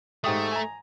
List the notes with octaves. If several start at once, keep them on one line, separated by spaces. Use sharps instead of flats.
G#2 A3 G4 D#6
G#5 A#5